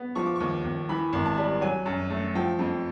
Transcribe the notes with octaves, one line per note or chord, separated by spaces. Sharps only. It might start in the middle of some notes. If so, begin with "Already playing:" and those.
Already playing: B3
F3 C#6
D6
D#2 C#6
D#2
E3 B5
G#1
A5
G3
F#3 G#5
F#2
A3
F3 G5
F2